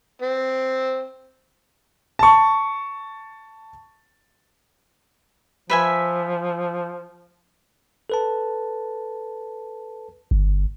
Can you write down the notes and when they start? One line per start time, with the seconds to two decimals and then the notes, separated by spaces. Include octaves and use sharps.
0.22 C4
2.19 A5 C#6
5.70 F3 B4 E5 G#5
8.10 A4 B4 A5
10.31 G1